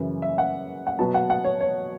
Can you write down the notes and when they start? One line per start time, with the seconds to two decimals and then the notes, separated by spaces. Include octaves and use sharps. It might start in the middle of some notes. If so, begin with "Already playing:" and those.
Already playing: F#2 C#3 E3 B4
0.22 E5
0.38 F#5
0.87 F#5
0.99 B2 F#3 B3 A5
1.14 F#5
1.30 F#5
1.44 C#5
1.61 C#5